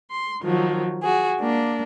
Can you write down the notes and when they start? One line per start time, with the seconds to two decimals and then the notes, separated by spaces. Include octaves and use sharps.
0.10 C6
0.43 D#3 F3 F#3
1.02 F#4 G#4
1.40 A#3 D4